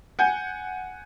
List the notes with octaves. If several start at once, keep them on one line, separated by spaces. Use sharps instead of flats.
F#5 G#5 G6